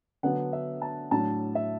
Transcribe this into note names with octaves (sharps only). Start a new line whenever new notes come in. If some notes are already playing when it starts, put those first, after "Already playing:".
D3 F#3 B3 D4 F#5
E5
A5
A2 F#3 D4 A5
E5